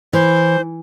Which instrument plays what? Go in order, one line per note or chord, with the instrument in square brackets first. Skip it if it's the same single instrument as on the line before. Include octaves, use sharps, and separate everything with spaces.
[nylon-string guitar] E3 [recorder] C5